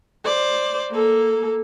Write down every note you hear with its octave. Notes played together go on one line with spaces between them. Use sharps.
C5 D5
A#3 A4